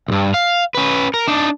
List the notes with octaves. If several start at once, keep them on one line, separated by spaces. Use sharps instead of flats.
C2 G2
F5
C#4 B4
A#4
D4 D#4